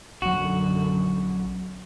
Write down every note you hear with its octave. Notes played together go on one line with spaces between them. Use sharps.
A#1 F#2 D3 F#3 F#4